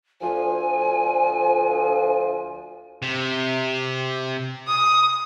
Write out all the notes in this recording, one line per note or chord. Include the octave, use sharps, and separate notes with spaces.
D2 F3 G#5
C3
D#6